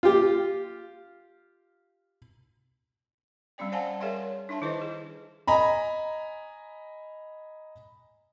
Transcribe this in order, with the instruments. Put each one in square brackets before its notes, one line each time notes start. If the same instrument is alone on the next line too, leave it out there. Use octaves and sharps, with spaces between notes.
[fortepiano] F4 G4
[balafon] G3 C4 C#4 D5 G5
C5 D5 F5 F#5 G#5 A5
G#4 A#4 C#5 E5 F5 C6
D4 D#4 E5 A5
D#3 E4 A4 B4 C5 D#5
G#4
[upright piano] D#5 G#5 A#5 B5